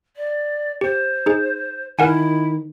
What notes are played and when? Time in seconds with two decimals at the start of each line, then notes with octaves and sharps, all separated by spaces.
0.16 D5
0.81 G4 C5
1.26 D#4 G#4
1.99 D#3 E4 A#4 F#5 G#5